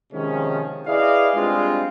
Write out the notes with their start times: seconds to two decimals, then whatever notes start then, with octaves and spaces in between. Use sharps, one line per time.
0.12 C3 D#3 F3 G#3 C#4
0.87 E4 G#4 B4 D5 D#5 F5
1.36 G3 G#3 C4 D4 F4